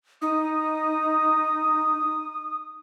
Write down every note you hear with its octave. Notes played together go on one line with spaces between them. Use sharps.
D#4 D#6